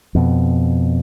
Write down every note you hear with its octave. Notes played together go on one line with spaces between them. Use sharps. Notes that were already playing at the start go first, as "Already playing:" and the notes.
F2 B2